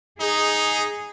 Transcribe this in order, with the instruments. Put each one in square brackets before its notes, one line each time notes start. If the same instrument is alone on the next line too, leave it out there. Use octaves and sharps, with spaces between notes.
[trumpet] D#4 [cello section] G#4